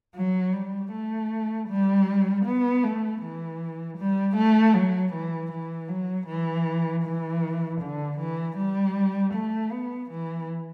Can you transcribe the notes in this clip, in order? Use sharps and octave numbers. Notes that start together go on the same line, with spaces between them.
F#3
G3
A3
G3
B3
A3
E3
G3
A3
F#3
E3
E3
F#3
E3
E3
D3
E3
G3
A3
B3
E3